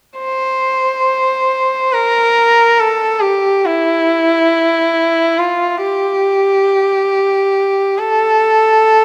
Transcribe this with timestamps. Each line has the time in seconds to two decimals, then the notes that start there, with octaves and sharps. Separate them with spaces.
0.19 C5
1.92 A#4
2.79 A4
3.22 G4
3.66 E4
5.38 F4
5.82 G4
7.98 A4